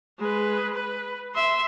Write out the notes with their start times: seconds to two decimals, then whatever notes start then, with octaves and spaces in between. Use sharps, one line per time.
0.19 G#3 B4
0.75 B4
1.35 E5 C6